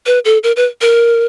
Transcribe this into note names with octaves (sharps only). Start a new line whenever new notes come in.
B4
A4
A#4
B4
A#4